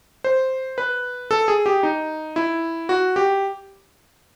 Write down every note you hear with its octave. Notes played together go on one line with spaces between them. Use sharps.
C5
B4
A4
G#4
G4
D#4
E4
F#4
G4